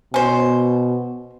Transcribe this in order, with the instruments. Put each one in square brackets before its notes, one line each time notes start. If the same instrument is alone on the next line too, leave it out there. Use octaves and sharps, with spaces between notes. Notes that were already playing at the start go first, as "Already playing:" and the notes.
[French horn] B2 [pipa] C#4 C5